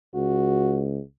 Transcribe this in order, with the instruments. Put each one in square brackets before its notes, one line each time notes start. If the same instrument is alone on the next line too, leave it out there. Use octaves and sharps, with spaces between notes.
[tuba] C#2 [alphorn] F#4